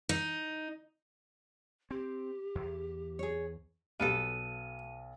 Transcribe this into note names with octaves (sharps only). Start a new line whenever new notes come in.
D#4
C4 G4
E2
G#4 C#5
B1 G2 G3 A#3 B3 A4 F6 D#7